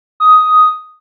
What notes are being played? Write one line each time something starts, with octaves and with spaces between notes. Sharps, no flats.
D#6